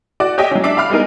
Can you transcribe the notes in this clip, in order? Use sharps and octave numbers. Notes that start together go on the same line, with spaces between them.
F#4 D5 D6
G4 C#5 D#5 E5 G5
F#3 C#4
D4 E5 D6 C7
F5 B5 D6 F6
G3 G#3 B3 D#4 A#4